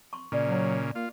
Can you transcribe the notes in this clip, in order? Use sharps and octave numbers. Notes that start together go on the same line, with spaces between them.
C6 C#6
A#2 C#3 D5 C#6
F#3
A#3 F4